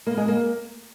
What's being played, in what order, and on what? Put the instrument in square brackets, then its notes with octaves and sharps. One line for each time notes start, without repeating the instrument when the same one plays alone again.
[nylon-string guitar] A#3
G#3
A#3